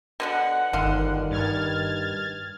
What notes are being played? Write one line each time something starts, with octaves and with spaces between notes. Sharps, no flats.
B2 D3 F3 F#5
G1 D3 D#3 F5 C6
G2 F6 G#6 A6